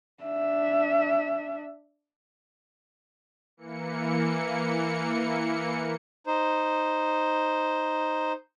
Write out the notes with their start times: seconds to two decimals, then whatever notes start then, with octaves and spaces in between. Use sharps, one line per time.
0.23 D4 E5
3.57 E3 A#3 C#7
6.27 D#4 C5